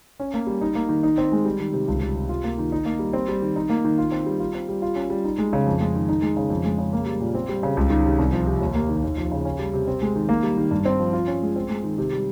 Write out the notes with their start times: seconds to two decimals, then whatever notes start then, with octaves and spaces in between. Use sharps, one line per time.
0.20 C#4
0.34 A#3
0.47 G3
0.62 D#4
0.75 A#3
0.89 D#3
1.03 D#4
1.18 C4
1.32 G#3
1.45 G3
1.60 D#3
1.73 C3
1.88 C#2
2.01 G3
2.16 C3
2.29 F4
2.44 A#3
2.58 D#3
2.72 D#4
2.85 A#3
2.99 G3
3.13 C4
3.28 G3
3.42 D#3
3.56 D#4
3.70 A#3
3.85 D#3
3.98 F4
4.12 C4
4.26 G3
4.39 F4
4.55 C4
4.69 G3
4.82 F4
4.96 C#4
5.10 G3
5.24 D#4
5.38 G#3
5.53 C#3
5.66 F2
5.81 G#3
5.95 D#3
6.09 D#4
6.22 G#3
6.37 C#3
6.50 F2
6.65 G#3
6.78 C#3
6.93 A#3
7.06 G3
7.20 A#2
7.35 C4
7.49 G3
7.63 C#3
7.77 C#2
7.90 D#3
8.05 C3
8.19 C2
8.33 F3
8.47 C3
8.61 D#2
8.75 A#3
8.89 D#3
9.04 D#2
9.17 F3
9.32 C#3
9.45 C#4
9.59 G3
9.73 C3
9.88 C4
10.02 G#3
10.16 D#3
10.29 A#3
10.43 G3
10.58 D#3
10.71 G2
10.85 C4
10.99 F3
11.13 F4
11.27 C#4
11.42 G#3
11.56 C4
11.70 G#3
11.84 D#3
11.98 C3
12.12 G3